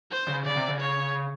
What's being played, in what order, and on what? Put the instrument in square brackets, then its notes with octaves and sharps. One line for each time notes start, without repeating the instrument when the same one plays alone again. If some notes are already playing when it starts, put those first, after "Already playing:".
[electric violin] C5
[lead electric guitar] C#3
[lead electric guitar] C#3 [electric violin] D5
[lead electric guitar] C3
C#3
[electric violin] C#5